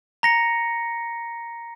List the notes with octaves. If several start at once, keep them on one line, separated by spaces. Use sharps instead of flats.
A#5 A#6 C#7